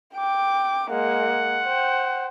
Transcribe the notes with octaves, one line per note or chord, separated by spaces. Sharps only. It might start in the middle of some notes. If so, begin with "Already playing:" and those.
G5 D6
G#3 A#3 F#5
C5 G5